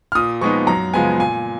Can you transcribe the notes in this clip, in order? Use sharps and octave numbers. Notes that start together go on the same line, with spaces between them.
F6
A#2 D#6
F3 G#3 B3 D#4 C#6
F#2 A#5
C#3 F3 G#3 B3 G#5
A#2 G#5